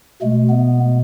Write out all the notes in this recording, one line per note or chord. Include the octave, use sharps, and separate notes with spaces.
B2 G#3 A3
B3